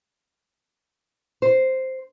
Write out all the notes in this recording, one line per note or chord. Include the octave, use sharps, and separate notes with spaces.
C5